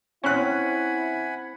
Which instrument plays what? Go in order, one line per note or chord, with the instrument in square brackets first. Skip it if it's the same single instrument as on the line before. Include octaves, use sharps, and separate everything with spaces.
[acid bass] C4 [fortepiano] C#4 F#6 [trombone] E4 [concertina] F#5 G#5 B5